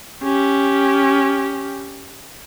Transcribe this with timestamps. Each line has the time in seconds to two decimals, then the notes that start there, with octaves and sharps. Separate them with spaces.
0.23 C#4 G4